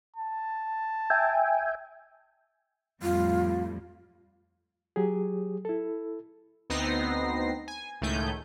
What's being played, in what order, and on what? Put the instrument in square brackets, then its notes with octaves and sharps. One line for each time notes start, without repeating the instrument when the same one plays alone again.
[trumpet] A5
[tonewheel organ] E5 G5 G#5
[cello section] F2 A2 G3 [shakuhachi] F4
[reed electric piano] F#3 G4 G#4
E4 A4
[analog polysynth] D2 B3 C4 D#4 A#6 C7
G#5
C#2 A2 D#3 A3 G#5 G6